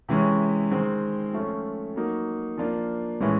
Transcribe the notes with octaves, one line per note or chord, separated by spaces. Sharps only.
C3 E3 G#3 C#4
D#3 G#3 C4
F3 A3 C#4 F4
F#3 A#3 D#4
F3 A#3 D4 F4
A2 E3 G#3 C#4